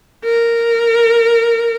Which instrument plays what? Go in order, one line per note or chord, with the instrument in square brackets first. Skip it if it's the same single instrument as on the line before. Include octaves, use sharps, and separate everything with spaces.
[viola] A#4